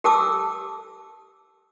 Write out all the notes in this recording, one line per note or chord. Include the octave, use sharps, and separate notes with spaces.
G4 A4 A5 D6 E6